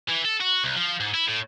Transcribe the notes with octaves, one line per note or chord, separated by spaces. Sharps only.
E3
A4
F#4
C2
F3
G#2
E4
A2